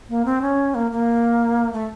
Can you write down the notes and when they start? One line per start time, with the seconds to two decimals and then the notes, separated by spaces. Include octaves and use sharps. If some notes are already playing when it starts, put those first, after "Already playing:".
0.09 A#3
0.25 C4
0.42 C#4
0.75 A#3
0.91 A#3
1.73 A3